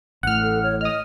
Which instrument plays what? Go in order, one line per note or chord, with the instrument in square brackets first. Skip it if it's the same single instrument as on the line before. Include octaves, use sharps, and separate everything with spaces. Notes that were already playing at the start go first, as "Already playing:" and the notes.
[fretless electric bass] A1 A2 [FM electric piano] F#5 F6
[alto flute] A4
C#5
[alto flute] D#5 [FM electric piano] D#6 F6